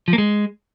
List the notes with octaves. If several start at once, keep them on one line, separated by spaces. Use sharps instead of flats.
F3
A#3
G#3